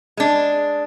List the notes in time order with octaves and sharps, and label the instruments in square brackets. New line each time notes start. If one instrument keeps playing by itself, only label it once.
[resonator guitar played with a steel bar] G#3 D4